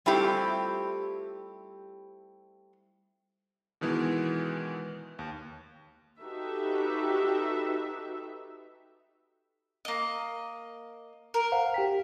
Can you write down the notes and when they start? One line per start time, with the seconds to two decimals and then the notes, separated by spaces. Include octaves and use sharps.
0.06 G3 A3 C4 E4 F4 G4
3.81 B2 D#3 E3 G#3 B3
5.19 D#2
6.21 D#4 F#4 G4 A4 B4 E5
9.85 A#3 D#5
11.34 A#4
11.52 C5 F5 F#5
11.74 G4 G5 B6